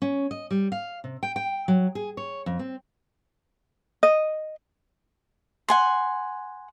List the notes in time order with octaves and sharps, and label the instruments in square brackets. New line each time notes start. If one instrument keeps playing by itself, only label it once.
[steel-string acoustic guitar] C#4
D#5
G3
F5
C3
G5
G5
F#3
G#4
C#5
F2
C4
[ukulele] D#5
[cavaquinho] F#5 G#5 C6